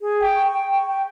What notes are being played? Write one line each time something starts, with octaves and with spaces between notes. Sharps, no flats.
G#4
G5
C#6
G5
C#6
G5